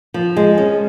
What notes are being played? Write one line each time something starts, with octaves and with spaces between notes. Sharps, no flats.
F3
G#3
C#4